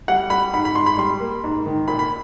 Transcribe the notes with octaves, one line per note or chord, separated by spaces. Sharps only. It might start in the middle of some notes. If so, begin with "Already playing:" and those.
G3 F#5
G3 B5
G#2 B5
B5
G#2 C6
B5
G3 C6
A#3
G#2
D#3
A#2 B5
B5